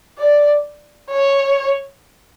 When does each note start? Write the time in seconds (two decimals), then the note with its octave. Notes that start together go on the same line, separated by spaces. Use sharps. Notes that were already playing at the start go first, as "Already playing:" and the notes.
0.19 D5
1.10 C#5